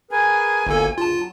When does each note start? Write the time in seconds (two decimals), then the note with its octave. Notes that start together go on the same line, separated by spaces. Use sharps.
0.11 G#4 A#4 B4 G#5
0.67 G1 D2 A#3 A4
0.98 D2 G2 C#3 F4 A5
1.13 F#3